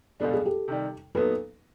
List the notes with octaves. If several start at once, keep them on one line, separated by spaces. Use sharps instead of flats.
C#2 B2 G3 B3 D4 A4
G#4
G4 A4
C3 D#3 G3
A#2 F#3 B3 D#4 A4 B4